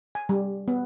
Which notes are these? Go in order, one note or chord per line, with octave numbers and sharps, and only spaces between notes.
G#5
G3
B3